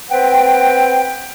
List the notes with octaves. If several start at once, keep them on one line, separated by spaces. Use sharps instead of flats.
C4 B4 F#5 G5